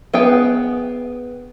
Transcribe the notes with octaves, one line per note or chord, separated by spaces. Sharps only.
B3 G#4 G5